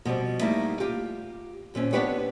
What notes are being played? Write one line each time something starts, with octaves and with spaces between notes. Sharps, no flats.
B2 F3 G3 C4
G3 A3 A#3 D#4 E4
F4 G4
D#2 A#2 C4 C#4
B3 C4 D4 G4 B4 C#5